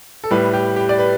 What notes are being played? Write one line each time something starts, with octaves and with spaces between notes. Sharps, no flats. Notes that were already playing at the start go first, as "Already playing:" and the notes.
A4
A2 G3 B4
G4
G4
D5
B4